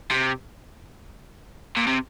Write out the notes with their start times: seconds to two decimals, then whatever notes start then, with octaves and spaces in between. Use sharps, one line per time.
0.11 C3
1.77 A#2
1.87 C3